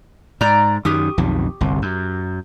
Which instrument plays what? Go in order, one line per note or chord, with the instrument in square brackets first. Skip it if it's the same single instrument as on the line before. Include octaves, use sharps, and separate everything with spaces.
[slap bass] G#2 [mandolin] D5 A#5
[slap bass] F#2 D#3 [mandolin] G4 C#6 D#6
[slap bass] B1 F2 D#3
G1 C2
F#2